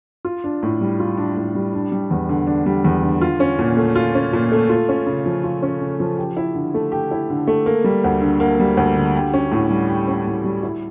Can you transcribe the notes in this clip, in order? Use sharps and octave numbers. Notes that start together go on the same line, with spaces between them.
F4
D4
A2
G3
F4
D4
A2
G3
D4
G3
E2
D3
D4
G3
E2
D3
F4
C#4
A#2
A3
F4
C#4
A#2
A3
F4
C#4
C#3
F3
F4
C#4
C#3
F3
G4
E4
D3
A3
G4
E4
D3
A3
A#3
G3
D2
D3
A#3
G3
D2
D3
G4
C#4
A2
G3
G4
C#4
A2
G3
E4